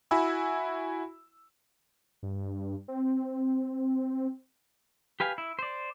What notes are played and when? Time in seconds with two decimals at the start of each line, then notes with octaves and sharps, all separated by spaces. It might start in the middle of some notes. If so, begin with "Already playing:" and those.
0.11 E4 F#4 G#5 B5 E6
2.23 G2
2.88 C4
5.20 G4 B4 F5 G#5
5.38 E4
5.59 C5 D5